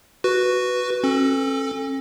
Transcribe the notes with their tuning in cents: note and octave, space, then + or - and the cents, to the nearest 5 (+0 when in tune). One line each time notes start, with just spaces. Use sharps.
F#4 +0 B4 +0
C#4 -45 A4 +0